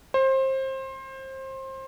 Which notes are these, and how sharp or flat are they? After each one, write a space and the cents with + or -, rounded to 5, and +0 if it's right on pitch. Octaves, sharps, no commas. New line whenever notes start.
C5 +25